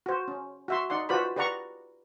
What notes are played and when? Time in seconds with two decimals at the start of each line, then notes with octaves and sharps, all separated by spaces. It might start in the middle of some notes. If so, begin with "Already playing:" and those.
0.06 F#4 C5
0.28 C#4
0.68 F#4 E5 C6
0.90 D#4 D5 F#5 C6
1.09 F4 F#4 B4 C5 D5 B5
1.36 G4 B4 D5 F#5 A#5 C#6